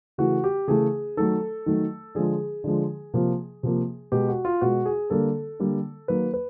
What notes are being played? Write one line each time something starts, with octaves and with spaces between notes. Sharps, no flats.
C#3 E3 A3 F#4
G4
C#3 E3 A3 G#4
D#3 F#3 A3 A4
D#3 F#3 A3
D3 F3 G#3 G#4
D3 F3 G#3
C3 F3 A#3
C3 F3 A#3
B2 G#3 G4
F#4
F4
B2 G#3 F#4
G#4
D3 G3 A#3 A4
D3 G3 A#3
D#3 F#3 A#3 B4
B4